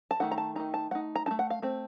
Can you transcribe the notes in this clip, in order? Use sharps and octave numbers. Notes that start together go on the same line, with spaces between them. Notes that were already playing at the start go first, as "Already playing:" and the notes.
A5
D#3 A3 D#4 F#5
A#5
A5
D#3 A3 D#4 A#5
A5
A3 D#4 F#5
A#5
D#4 A5
A3
F#5
F5
A3 C4